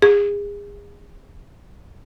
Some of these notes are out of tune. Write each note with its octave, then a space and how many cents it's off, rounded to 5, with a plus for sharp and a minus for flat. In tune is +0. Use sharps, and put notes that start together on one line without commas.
G#4 -35